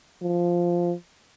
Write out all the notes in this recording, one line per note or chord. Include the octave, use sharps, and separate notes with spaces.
F3